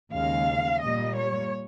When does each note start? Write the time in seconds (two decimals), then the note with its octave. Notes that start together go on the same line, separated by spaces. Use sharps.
0.12 D#2 C#3 G#3 F5
0.82 A#2 G3 A#3 D#5
1.17 C#5